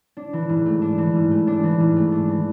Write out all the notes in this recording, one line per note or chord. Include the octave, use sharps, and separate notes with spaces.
D4
E3
G#2
A3
D4
E3
G#2
A3
D4
E3
G#2
A3
D4
E3